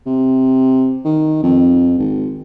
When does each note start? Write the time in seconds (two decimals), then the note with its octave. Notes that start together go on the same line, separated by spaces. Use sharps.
0.06 C3
1.05 D#3
1.43 F2
1.98 G#1